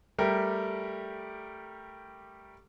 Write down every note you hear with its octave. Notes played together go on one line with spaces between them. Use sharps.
G3 A3 G4 A#4